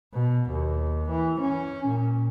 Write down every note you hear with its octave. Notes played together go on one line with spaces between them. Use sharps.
B2
D#2
E3
C#4
A#2